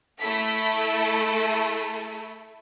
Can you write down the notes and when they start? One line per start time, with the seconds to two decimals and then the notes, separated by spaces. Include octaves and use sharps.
0.20 A3 E4 A4 B6